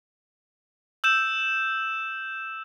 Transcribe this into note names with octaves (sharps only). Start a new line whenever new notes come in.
E6 G6 E7